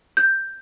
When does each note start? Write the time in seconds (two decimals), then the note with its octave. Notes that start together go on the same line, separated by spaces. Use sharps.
0.17 G6